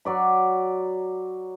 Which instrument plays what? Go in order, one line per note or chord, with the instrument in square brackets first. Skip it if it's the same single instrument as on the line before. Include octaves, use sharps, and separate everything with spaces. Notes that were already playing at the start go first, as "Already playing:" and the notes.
[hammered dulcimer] F#3 D5 B5